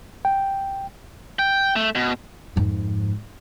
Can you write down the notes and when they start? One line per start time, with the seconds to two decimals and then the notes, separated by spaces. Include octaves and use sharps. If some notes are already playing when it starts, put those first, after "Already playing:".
0.25 G5
1.39 G5
1.76 A3
1.95 B2
2.56 F2 G#2